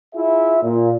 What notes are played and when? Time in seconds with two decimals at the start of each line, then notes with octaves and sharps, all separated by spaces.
0.15 E4 F4 G#4 E5
0.62 A#2